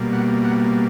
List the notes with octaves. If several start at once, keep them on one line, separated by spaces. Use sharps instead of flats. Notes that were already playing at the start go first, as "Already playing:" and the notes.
Already playing: B2 G3 A#3
F#5
F#5